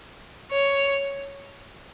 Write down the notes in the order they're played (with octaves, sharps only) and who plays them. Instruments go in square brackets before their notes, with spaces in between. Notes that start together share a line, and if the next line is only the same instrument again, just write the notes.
[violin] C#5